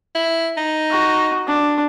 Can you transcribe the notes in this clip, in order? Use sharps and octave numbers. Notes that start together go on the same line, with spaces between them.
E4
D#4
F#4
D4